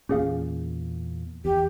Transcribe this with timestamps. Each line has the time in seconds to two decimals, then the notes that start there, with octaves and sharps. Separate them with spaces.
0.09 E2 A#2 C#4 G#4 F5
1.45 E2 G4